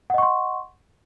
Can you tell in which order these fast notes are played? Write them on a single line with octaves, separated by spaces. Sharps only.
F#5 D#5 C#6 C6